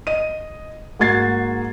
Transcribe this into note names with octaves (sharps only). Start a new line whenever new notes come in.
D#5 D#7
G#2 A#3 F#4 G#6 A6 C7